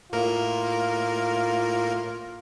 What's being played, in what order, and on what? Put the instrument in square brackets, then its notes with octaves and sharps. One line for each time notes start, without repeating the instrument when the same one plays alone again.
[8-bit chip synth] A2 A#3 A#4 [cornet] F4